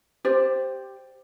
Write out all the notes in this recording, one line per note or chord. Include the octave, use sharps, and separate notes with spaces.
G4 C5 D5